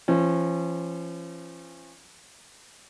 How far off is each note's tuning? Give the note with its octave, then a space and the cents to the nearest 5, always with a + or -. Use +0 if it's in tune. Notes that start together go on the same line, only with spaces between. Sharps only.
F3 -40 C#4 -25